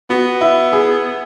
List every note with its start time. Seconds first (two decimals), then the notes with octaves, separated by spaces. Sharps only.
0.10 B3 F#4
0.41 E4
0.73 G#4